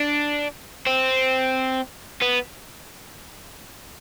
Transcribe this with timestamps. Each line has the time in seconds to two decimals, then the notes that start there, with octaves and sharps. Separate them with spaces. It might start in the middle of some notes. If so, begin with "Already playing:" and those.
Already playing: D4
0.87 C4
2.21 B3